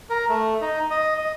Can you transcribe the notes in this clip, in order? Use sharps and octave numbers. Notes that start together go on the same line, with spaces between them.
A#4
A3
D#4
D#5
D#5